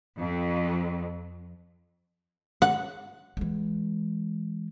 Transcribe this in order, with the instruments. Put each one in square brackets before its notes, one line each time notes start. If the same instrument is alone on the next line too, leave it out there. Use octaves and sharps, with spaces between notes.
[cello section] F2
[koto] F#5
[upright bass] E3 G#3